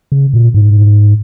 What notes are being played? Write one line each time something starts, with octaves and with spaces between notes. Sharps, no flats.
C#3
A#2
G#2